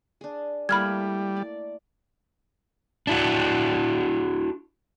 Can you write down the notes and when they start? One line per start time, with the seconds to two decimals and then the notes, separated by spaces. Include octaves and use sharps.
0.21 D4 G#4
0.69 G3 A3 A#3 E4 B5 F6 G#6
1.37 D5
3.07 D4 E4 F#4